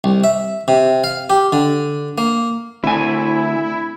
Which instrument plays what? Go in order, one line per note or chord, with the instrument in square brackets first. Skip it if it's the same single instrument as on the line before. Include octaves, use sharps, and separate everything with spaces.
[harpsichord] C2
E5
C3
F5
G4
D3
A#3
[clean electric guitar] D2 G#5 [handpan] A3 C4 D4 [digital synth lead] E4